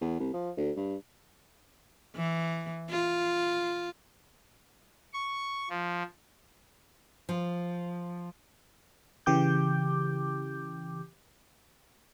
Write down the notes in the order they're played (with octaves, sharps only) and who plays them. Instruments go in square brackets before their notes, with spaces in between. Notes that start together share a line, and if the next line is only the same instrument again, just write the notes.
[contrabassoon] E2
C2
F3
D2
G2
[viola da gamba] E3
F4
[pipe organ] C#6
F3
[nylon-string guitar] F3
[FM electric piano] C#3 E3 G4 D6 G6